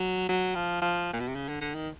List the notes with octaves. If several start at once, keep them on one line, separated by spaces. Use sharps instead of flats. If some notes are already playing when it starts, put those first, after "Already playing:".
Already playing: F#3
F#3
F3
F3
A#2
B2
C3
C#3
D3
D3
D#3